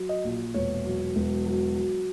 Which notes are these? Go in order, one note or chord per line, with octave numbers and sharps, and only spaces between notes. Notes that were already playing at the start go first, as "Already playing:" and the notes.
Already playing: F#3
D#5
A#1
E1 C#5
F#3
E1
F#3
F#3